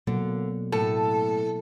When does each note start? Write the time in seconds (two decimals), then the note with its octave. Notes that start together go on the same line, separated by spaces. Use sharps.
0.07 B2 D3 F#3 A#3
0.72 A2 A4